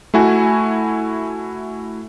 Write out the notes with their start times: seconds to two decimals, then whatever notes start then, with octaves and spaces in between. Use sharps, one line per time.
0.14 A3 E4 F#4 G#5